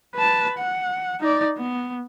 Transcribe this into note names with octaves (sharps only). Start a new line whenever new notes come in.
B4 A5
F#5
D#4 D5
B3